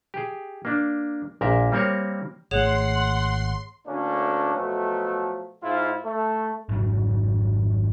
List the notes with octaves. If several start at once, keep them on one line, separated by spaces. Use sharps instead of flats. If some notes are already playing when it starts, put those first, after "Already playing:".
G4 G#4
A#3 D4
A#1 A#2 A#4 E5
G3 A#3 C4 A#4 C#5
G#1 A3 G#4 C#5 F#5 C6 E7
D2 A2 A#3 C#4 D4
B2 F3 F#3 A3
G#2 E4 F4
A3
G#1 F2 G#2 F#3